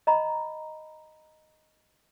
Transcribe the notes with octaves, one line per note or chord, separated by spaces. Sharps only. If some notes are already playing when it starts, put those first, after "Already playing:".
D#5 A#5 B5